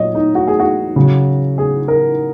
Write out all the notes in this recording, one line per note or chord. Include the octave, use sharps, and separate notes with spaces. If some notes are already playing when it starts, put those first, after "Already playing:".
Already playing: A#2 F#3 C#5 D#5
D#4
F#4
G#4
F#4
C#3 F#3
G#4
A#4